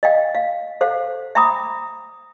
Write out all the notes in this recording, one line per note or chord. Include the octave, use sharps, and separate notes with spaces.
D#5 F5 G5
F5
A4 C5 F5 F#5
E5 G5 A#5 B5 D6 D#6